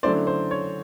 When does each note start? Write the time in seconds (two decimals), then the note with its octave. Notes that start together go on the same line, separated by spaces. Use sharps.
0.03 D3 F#3 A3 C#4 E4 C5 D5
0.27 C5
0.51 C#5